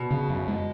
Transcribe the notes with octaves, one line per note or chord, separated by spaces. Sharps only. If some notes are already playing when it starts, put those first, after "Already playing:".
Already playing: B2
C#3
F#2
G#3